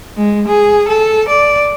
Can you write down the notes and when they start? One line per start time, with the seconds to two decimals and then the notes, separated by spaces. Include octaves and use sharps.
0.17 G#3
0.48 G#4
0.88 A4
1.29 D5